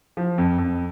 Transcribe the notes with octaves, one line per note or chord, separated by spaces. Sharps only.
F3
F2
F2